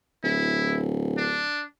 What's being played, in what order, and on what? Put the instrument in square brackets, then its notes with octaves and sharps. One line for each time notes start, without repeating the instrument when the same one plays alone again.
[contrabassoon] D1 [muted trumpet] E4
[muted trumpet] D4